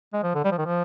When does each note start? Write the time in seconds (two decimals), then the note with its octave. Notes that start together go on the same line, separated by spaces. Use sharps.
0.13 G#3
0.23 F3
0.35 D3
0.44 G3
0.52 F3
0.58 D#3
0.66 F3